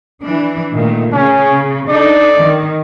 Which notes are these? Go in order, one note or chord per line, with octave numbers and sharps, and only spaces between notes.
E3 D4
A#2 D#3 A3
C#3 C#4
D4 D#4 A4 D5
D#3